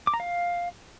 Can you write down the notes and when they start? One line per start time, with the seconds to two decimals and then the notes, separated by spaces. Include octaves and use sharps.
0.07 D6
0.14 A#5
0.20 F5